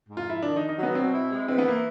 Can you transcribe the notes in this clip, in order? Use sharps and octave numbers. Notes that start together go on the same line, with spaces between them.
G#2
F4
F3 E4
D#3 D4
D#4
D#3
D#4
F#3
B3
B2 C4
E4
G#3
E3 C4
B3
A#3 E4